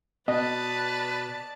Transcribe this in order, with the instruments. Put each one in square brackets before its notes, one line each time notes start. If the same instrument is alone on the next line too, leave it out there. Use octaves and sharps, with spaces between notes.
[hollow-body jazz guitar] B2 [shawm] B4 [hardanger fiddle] D5 A5 [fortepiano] D#5